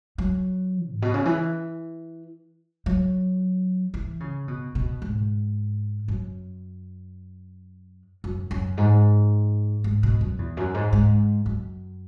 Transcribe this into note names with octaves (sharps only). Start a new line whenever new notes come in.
F#3
G#2
B2
C#3
E3
F#3
E3
C#3
B2
B2
G#2
F#2
F#2
F#2
G#2
G#2
B2
F#2
E2
F#2
G#2
G#2
F#2